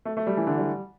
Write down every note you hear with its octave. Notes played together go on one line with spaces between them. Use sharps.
A3
A3
G3
E3
D3
G3